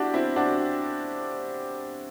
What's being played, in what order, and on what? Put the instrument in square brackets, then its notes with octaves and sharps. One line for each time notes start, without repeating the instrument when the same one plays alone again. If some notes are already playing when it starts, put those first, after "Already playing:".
Already playing: [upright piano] D4 E4 F#4 G4
C4 E4
D4 F#4